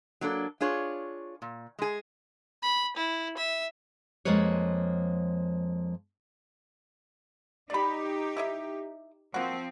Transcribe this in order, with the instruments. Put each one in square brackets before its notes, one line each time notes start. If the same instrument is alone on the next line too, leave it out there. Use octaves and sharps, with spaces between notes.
[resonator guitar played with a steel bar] F#3 A#3 D4 A4
D4 F4 G#4 C#5
A#2
G#3 G#4
[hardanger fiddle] B5
E4
E5
[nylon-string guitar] F2 F3 G#3 A#3 B4 C#5
[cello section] D#4 G4 [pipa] D5 B5
[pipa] E4 D#5 E5
[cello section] F3 C4 [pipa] A#3 F#4